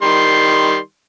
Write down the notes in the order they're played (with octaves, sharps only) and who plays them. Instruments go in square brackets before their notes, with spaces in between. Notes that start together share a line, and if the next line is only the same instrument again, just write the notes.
[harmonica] D#3 G3 C6